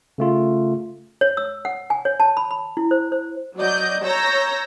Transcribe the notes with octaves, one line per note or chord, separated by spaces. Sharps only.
C#3 A3 F4
C#5
E6
F#5
G#5
C#5
A5
B5
B5
E4
C5
C5
F#3 D5 D#5 G6
C#5 A#5 E6 G6 A#6